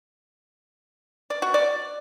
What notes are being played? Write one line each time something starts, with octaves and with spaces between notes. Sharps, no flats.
D5
F#4
D5